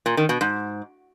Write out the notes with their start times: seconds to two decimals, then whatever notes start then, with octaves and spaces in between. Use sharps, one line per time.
0.06 A#2
0.17 D#3
0.29 B2
0.41 G#2